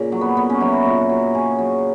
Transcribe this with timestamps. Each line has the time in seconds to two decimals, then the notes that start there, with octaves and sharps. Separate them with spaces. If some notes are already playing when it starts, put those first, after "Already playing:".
Already playing: A#2 C#3
0.12 F#3
0.21 B3
0.37 A#2 B3
0.50 C#4
0.61 F#3 E4
0.73 F#4
0.86 A#2
1.09 F#3
1.35 C#3 G#4
1.59 F#3